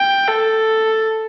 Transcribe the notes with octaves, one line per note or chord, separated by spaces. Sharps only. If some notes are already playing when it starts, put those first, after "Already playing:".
Already playing: G5
A4